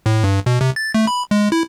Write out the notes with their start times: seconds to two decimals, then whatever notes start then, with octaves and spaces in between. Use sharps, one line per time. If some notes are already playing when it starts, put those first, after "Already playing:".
0.06 A2
0.24 G2
0.46 B2
0.61 C3
0.76 A6
0.94 A3
1.07 B5
1.31 G#3
1.52 E4